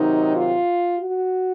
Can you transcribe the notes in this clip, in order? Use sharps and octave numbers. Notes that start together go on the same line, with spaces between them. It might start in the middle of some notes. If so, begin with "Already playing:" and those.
Already playing: C3 D#3 F#3 D#4
F4
F#4